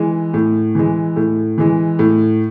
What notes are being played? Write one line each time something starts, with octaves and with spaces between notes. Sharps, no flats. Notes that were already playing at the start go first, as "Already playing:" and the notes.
Already playing: E3 G#3
A2
E3 G#3
A2
E3 G#3
A2